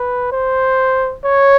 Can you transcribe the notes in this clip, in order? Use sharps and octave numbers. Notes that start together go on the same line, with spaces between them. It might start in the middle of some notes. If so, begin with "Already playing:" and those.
Already playing: B4
C5
C#5